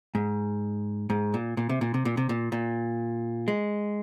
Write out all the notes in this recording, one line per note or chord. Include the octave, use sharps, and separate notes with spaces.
G#2
G#2
A#2
A#2
C3
A#2
C3
A#2
C3
A#2
A#2
G#3